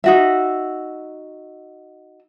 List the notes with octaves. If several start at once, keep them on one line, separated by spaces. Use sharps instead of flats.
D#4 F#4 E5